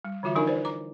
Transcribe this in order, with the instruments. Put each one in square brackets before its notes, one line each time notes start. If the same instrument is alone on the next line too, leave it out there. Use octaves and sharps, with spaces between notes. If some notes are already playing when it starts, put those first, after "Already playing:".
[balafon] G3
D3 E3 G3 F4 F#4 E5
F3 D4 D#4 A#4 G#5
E4 B4 C5 D5
A#5 D6